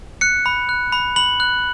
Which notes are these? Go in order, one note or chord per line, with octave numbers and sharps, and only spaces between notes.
F#6 C#7
B5
F#6
B5
B5 F#7
F#6